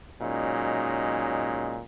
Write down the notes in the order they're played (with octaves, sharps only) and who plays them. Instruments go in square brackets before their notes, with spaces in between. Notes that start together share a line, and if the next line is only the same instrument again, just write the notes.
[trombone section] A#2 F#3 G#3 C#4 D#4